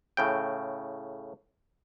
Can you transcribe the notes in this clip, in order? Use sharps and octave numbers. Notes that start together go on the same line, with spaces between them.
A2 C#3 G5